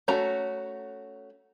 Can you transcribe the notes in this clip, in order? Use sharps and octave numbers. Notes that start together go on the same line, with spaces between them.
A3 C#4 F#4 A#5